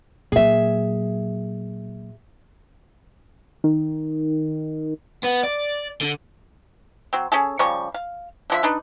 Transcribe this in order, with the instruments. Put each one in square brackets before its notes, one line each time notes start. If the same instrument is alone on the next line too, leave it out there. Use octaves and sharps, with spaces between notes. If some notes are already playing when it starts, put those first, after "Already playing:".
[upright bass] A#2 F#3 [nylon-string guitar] G#4 E5
[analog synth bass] D#3
[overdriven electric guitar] B3
D5
D3
[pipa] F#3 C4
C#4 G#4 A4
C#3 F3 G3 C#6
F5
D3 F3 E5
D4 D#4 B4